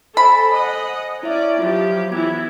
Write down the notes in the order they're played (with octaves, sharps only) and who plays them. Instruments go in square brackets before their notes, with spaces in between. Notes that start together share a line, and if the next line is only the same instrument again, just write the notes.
[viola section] A4 [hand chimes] C5 G#5 [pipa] B5
[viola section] D#5 F#5
[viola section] C#4 D5 [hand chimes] E4 E5
[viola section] F3 F#3 G4 [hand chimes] F4 E5
[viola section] E3 B3 E4 [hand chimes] G#6